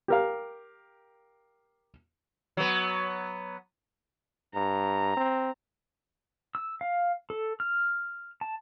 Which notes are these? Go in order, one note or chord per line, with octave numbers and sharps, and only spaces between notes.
G4 A#4 F5
F#3 B3
G2 A#5
C4
E6
F5
A4
F6
A5